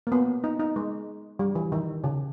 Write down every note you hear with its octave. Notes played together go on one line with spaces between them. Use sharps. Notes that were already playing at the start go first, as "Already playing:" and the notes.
A#3
B3
D#4
D#4
G#3
G3
E3
D#3
C#3